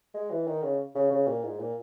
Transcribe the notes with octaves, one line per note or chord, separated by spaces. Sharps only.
G#3
E3
D#3
C#3
C#3
C#3
A#2
G#2
A#2